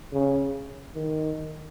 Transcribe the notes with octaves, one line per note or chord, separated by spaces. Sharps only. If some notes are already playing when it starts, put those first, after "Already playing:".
C#3
D#3